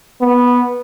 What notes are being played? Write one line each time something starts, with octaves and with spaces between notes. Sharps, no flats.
B3